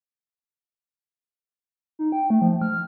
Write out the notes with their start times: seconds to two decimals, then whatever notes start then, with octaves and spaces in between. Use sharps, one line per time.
1.99 D#4
2.12 G5
2.30 A3
2.42 F3
2.62 F6